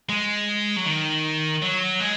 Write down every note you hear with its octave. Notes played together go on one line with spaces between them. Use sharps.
G#3
F#3
D#3
F#3
G#3